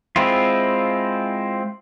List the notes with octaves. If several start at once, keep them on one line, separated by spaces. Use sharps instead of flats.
G#3 C4 E4 F4